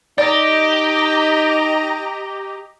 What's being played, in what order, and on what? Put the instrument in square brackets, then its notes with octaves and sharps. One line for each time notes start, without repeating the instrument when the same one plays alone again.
[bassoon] D#4 [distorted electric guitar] G4 [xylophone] D5 [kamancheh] D#5 A#5